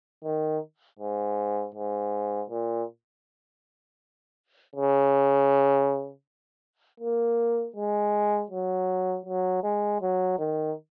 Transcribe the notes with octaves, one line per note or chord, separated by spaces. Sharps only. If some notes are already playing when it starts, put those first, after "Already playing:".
D#3
G#2
G#2
A#2
C#3
A#3
G#3
F#3
F#3
G#3
F#3
D#3